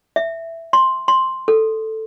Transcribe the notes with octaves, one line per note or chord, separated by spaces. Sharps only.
E5
C6
C6
A4